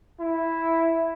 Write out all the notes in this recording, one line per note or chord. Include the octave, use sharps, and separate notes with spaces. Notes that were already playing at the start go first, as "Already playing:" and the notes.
E4